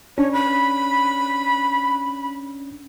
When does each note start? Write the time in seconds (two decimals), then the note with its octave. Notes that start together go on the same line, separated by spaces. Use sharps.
0.18 C#4 D4 C#5
0.32 B5